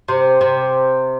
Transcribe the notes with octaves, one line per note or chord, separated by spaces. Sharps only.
C3
C3